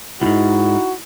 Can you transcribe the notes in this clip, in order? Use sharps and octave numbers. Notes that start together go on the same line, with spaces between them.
C#2 G#2 D#4 E4 F#4